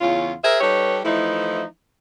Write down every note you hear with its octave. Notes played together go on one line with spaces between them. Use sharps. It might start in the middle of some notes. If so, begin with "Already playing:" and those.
E2 C#3 C#4 F4
G#4 A#4 C5 E5
G3 D#4 G4 A4 B4 C#5
E3 F3 A3 D#4 E4